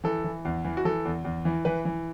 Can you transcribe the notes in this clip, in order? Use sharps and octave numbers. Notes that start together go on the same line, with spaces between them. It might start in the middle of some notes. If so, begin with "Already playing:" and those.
E3 A4
E3
E2
E3
F#4
E3 A4
E2
E2
E3
E3 B4
E3